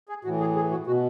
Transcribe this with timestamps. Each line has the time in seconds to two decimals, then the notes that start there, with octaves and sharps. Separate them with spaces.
0.09 G#4
0.24 A2 E3 F#4
0.40 G#4
0.56 G#4
0.71 F#4
0.87 B2 F#4